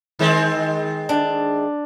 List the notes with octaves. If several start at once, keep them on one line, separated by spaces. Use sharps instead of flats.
D#3 G#3 C4
D4